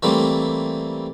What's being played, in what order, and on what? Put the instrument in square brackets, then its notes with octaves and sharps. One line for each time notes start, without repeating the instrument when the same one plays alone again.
[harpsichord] E3 G3 A3 A#3 C4